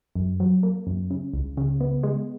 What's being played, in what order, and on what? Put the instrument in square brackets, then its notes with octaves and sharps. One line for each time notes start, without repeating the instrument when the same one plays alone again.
[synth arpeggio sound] F#2
F#3
A#3
F#2
C#3
C#2
C#3
B3
G#3